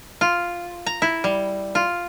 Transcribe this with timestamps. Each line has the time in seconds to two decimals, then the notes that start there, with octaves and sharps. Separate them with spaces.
0.21 F4
0.86 A#5
1.02 E4
1.24 G3
1.75 F4